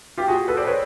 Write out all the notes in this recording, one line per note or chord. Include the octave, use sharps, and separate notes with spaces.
F4 G4
F#4 G#4
A4 B4
C5 D5
B4 C#5